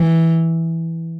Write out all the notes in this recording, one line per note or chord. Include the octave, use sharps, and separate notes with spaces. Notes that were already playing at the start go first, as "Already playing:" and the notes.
Already playing: E3